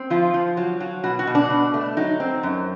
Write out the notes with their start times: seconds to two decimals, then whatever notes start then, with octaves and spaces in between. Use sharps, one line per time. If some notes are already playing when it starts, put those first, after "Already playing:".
Already playing: C4
0.10 F3 F4
0.34 F3
0.57 F#3
0.80 F#3
1.04 B2 F#4
1.19 F#4
1.27 B2
1.35 D4
1.50 B2
1.74 A3
1.97 F#3 D#4
2.20 C4
2.43 F#2